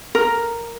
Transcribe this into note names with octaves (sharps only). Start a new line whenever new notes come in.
A#4